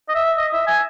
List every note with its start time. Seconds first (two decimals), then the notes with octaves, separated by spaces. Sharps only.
0.09 D#5
0.15 E5
0.37 D#5
0.53 E5
0.67 G#5